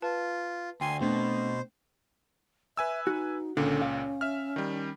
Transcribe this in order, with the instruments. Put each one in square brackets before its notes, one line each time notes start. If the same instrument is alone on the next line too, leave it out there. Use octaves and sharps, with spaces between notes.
[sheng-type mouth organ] F4 [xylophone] B4 A5
[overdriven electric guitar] D2 [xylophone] G5 [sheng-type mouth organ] G#5 C6
[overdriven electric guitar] B2 [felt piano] A3 C4 D4 [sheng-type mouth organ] C5
[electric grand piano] B4 G#5 E6 [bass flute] E5
[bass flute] D#4 [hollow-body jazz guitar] F#4
[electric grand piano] C#2 A#2 [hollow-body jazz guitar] D3 [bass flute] C#4
[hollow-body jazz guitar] F5
[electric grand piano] E5 F6
D#3 G3